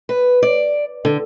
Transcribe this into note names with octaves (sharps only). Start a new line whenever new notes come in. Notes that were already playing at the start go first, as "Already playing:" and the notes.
B4
D5
D3